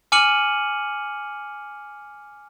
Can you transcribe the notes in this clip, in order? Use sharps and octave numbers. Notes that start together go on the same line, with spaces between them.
G#5 D6 F6 C#7 D#7 F#7